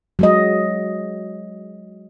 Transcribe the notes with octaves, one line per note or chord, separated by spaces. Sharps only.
F#3 G#3 D#5